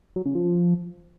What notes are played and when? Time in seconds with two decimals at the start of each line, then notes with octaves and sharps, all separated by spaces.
0.16 F#3
0.26 C#3
0.35 F3